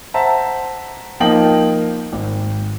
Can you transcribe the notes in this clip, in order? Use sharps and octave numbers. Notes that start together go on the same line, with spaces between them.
C5 E5 F#5 A5 A#5
F3 A#3 D#4 F4 G5 F#7
G#1